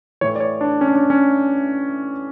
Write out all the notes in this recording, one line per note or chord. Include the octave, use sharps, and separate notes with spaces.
A2 E3 C#5
D5
C#5
D4
C#4
D4
C#4
C#4